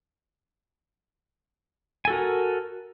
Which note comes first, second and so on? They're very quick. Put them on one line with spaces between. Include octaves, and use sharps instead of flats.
G#5 A4 F#4 A#4